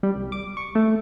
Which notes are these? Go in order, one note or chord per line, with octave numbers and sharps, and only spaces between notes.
G3
C2
D6
C#6
A3